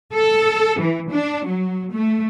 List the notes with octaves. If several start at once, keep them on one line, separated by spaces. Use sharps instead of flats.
A4
E3
D4
F#3
A3